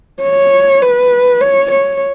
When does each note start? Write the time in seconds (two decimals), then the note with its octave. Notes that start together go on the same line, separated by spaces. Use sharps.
0.23 C#5
0.83 B4
1.41 C#5
1.71 C#5